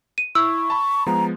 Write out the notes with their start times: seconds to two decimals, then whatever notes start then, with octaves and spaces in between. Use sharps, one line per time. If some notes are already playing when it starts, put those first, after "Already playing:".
0.18 D#7
0.35 E4 C#6 E6
0.70 A5 B5
1.06 F3 G#3 B3 A#5